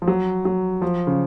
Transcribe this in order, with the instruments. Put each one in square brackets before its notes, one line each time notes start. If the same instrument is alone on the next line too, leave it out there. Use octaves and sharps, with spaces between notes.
[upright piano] F3
F#3
F#3
F3
C#3